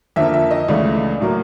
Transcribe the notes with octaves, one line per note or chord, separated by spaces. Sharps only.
F2 D3 F3 A#3 E5
E5
D#5
C#2 C#3 E3 A3 D5
A2 F#3 A#3